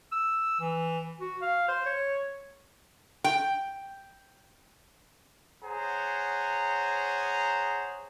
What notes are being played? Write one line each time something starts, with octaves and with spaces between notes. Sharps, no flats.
E6
E3
F#4
F5
C5
C#5
G5
G#4 C5 C#5 F#5 A#5